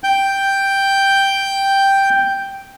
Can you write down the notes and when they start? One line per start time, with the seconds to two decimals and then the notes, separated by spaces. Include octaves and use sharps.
0.04 G5 G6